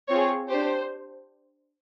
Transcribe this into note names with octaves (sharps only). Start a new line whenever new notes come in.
C4 F4 G#4 C#5
D4 G4 C5